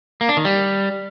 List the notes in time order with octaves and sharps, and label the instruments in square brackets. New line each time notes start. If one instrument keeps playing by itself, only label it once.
[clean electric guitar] A#3
D4
D#3
G3